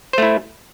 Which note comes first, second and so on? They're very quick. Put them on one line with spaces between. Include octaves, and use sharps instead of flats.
C5 A3 E4